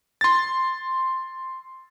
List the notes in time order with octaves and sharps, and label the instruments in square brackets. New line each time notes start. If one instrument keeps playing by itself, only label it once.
[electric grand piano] C6 A6